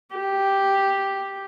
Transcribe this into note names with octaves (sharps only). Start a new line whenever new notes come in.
G4